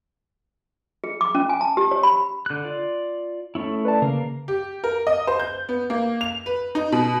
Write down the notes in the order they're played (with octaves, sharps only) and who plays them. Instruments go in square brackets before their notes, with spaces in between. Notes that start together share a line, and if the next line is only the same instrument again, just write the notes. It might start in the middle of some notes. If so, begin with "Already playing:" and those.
[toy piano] G#4
D6
C#4
G#5
A5
G4
C#5
B5
[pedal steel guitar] D3 F#6
F4 D5
A3 C#4 E4
[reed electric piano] B4 D5 A5
[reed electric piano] C#3 [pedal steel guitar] A#3 A#4 F5
[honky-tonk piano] G4
A#4
D#5
C5
G6
B3
A#3
F7
B4
D#4
B2